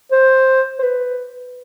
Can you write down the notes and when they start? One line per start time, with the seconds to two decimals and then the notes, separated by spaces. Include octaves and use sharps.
0.12 C5
0.79 C5
0.83 B4